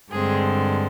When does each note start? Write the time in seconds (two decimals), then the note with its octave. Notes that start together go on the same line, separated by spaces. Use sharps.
0.11 G2 D3 G#3 C4 G#4